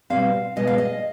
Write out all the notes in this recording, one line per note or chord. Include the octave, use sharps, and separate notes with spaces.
B2 G3 C4 F5
B2 G#3 B3 D#5
F5
D#5